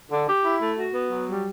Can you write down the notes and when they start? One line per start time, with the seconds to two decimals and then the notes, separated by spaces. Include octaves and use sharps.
0.10 D3
0.27 G4
0.43 E4
0.60 A3
0.76 F#4
0.94 B3
1.10 F#3
1.27 G3